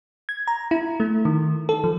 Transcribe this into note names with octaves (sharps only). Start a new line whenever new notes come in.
G#6
A#5
E4
A3
D#3
A4
F3